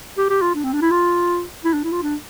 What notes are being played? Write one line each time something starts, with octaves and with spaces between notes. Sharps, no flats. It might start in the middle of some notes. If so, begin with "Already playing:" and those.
G4
G4
F4
D4
C4
D4
E4
F4
E4
D4
E4
F4
D4